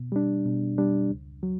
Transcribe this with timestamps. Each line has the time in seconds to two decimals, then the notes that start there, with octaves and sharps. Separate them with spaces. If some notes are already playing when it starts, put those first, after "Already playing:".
Already playing: B2
0.12 G3 D4
0.45 B2
0.78 G3 D4
1.11 C#2
1.43 F#3